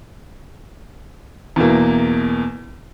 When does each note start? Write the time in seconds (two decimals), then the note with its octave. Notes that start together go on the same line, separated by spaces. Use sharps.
1.56 E2 B2 A#3